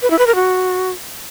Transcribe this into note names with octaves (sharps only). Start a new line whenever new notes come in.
B4
E4
B4
A#4
F#4